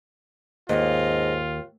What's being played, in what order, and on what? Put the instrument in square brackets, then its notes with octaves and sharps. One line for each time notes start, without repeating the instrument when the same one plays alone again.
[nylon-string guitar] D#2 [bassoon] G#2 [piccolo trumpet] F4 [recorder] D#5